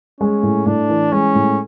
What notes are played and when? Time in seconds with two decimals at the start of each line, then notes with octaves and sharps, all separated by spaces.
0.21 G#3 C#4
0.43 A2
0.66 A2 D4
0.89 E3
1.12 G#3 C#4
1.35 A2